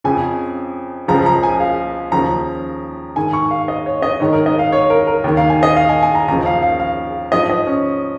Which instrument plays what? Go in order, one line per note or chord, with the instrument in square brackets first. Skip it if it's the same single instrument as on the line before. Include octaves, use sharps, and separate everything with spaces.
[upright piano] F2 C#3 F3 G#5
C#2 C#3 F3 A#5
A#5
G#5
F5
D#2 C#3 F3 A#5
G#2 D#3 G#5
C#6
F5
D#5
C#5
D#5
G#2 D#3 C#5
A#4
D#5
F5
C#5
A#4
A#4
D#2 D#3
F5
G#5
D#5
F5
G#5
G#5
A#5
D#2 C#3 F3 A#5
F5
F5
F5
G#2 F3 D#5
D#5
C#4